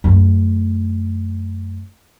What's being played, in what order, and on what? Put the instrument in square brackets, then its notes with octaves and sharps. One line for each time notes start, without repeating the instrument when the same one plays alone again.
[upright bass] F#2 A3